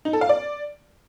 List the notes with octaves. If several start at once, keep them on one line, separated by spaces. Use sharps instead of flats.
D#4
A4
F5
D5